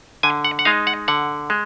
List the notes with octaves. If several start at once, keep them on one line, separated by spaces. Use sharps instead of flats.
D3 G#5
F#5
F#5
G#3 D#4 F5
F#5
D3 F#5
G#3